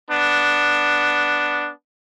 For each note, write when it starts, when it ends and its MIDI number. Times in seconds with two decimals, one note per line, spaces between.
0.10 1.71 59
0.10 1.71 62